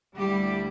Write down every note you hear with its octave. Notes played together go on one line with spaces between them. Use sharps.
D2 D3 G3 A3 E4 G4